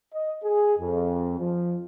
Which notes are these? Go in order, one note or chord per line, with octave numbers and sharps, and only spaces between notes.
D#5
G#4
F2
F3